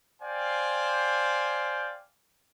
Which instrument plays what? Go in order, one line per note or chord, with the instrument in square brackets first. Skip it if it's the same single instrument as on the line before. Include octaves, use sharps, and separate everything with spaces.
[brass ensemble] C5 D5 F5 G5 G#5